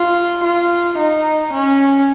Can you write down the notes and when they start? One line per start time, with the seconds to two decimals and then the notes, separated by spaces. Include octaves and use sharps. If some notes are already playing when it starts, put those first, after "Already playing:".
Already playing: F4
0.43 F4
0.98 D#4
1.52 C#4